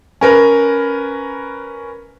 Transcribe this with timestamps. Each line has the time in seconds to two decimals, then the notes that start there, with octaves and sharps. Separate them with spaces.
0.21 C#4 A#4 B4